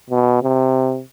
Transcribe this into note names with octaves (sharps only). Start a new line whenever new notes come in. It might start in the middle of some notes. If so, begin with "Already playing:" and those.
B2
C3